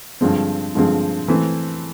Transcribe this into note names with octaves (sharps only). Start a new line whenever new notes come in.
G2 D3 F3 G#3 C4
G2 D3 F3 G#3 C4
E3 A3 C4 E4